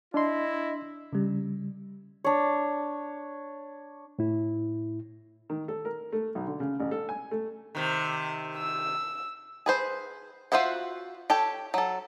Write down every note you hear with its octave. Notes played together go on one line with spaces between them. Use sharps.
D4 E4 D#5 C6
C#3 G3
D4 C#5
A2 E4
D#3
A4
A#4
A3
B1
D3
C#3
A1
A4
G#5
A3
C3 D#3
E6
G#4 B4 C5
F4 F#4 C5 E5 F#5
G4 A4 C#5 G5
F#3 A4